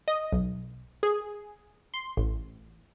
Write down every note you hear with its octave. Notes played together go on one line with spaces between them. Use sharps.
D#5
B1
G#4
C6
A1